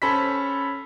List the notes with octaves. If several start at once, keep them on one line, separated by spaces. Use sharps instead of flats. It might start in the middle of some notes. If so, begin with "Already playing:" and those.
C#4 A4 C5 B5 B6